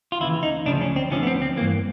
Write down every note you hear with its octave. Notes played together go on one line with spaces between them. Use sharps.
F4
D#2 C#3 E3 E4
D#4
D2 C#3 F3 D4
C#4
C4
D2 D3 F3 C#4
B3
C4
C4
G2 E3 A#3